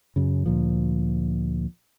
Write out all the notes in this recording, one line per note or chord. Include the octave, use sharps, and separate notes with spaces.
F#2 C#3
D2 A#2 F3